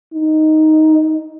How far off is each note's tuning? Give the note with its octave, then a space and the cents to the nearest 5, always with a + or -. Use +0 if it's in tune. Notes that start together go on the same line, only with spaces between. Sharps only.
D#4 +5